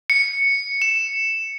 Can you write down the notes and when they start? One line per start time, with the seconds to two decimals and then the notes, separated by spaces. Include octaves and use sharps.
0.10 C#7
0.82 E7